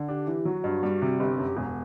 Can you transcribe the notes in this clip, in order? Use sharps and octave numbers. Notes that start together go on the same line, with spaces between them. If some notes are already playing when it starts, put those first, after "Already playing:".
Already playing: D3
D4 G4
E3
F#3 F#4
G2
G3
C3
G1 G4
F#2
E1 B3